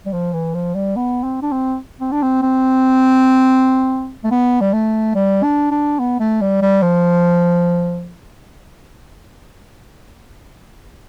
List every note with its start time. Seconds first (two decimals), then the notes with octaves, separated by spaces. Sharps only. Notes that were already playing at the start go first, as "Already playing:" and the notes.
0.06 G3
0.13 F3
0.33 E3
0.54 F3
0.75 G3
0.96 B3
1.24 C4
1.42 D4
1.52 C4
2.01 C4
2.12 D4
2.22 C4
2.43 C4
4.24 A3
4.31 B3
4.61 G3
4.73 A3
5.15 G3
5.43 D4
5.71 D4
5.99 B3
6.20 A3
6.41 G3
6.62 G3
6.82 F3